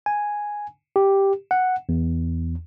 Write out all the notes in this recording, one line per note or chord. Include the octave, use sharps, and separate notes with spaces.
G#5
G4
F#5
E2